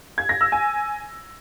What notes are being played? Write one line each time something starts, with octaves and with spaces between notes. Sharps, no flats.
G#6
A#6
E6
G#5